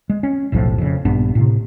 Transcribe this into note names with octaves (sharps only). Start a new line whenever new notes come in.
G#3
C#4
F1 B1 A2 F3
F2 C#3
A#1 G2 B3 D4
A2 C3